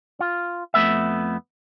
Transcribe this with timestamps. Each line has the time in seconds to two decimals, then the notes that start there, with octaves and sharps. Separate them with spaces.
0.20 F4
0.74 F2 A3 B3 E5